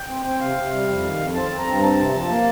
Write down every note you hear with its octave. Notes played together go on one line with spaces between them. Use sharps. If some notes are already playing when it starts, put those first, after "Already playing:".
Already playing: G5
C4
C4
C3 F5
C3
G3
F2
D#3
F2
C4 A5
C4
A#5
G2
C4 A5
C3
F3
A#3